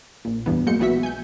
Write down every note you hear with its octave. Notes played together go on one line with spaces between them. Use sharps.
A#1 A#2
E2 G2 E3 B3
F#3 G#3 A#3 G6 C#7
A#1 E3 B3 F#4 E5 B6
G#5 G6